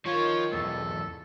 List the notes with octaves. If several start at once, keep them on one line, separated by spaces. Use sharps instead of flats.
D#3 F3 F4 C#5
B1 E2 A4